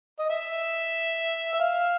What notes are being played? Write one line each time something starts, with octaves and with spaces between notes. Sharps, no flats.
D#5
E5
E5
F5